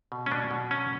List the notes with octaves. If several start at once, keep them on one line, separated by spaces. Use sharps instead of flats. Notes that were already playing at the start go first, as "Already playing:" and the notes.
B2
C#4
B2 D4
B2
F#3 C#4